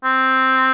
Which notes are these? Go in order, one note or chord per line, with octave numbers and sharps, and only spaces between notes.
C4